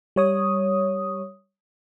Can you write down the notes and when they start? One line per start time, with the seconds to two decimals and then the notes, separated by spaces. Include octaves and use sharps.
0.16 G3 C#5 D#6